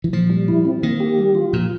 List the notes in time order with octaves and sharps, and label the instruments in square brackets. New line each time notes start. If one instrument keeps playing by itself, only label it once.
[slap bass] E3
[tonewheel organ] A#2 [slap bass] F3
[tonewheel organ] G3
E4
C4
[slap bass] D#3 [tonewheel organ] A#3
[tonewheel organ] G4
G3
F4
[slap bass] A#2 [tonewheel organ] F3